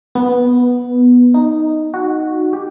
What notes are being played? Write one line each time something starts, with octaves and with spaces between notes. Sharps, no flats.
B3
D#4
F#4
G4